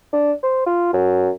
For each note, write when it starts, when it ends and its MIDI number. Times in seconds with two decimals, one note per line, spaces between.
0.13 0.32 62
0.43 0.65 72
0.66 0.91 65
0.93 1.29 42